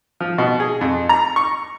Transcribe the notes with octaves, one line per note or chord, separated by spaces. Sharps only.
F3
B2
G#4
F2
A#5
C#6